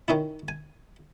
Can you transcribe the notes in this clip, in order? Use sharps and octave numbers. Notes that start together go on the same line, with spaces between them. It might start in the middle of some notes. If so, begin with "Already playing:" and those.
D#3 C#4 D#4 E4
G#5